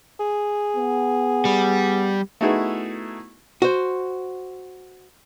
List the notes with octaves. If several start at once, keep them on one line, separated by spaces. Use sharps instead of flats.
G#4
B3
G3
A3 B3 D#4 E4 F#4 G#4
F#4 C5